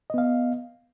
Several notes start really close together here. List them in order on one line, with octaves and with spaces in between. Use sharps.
D#5 B3 F5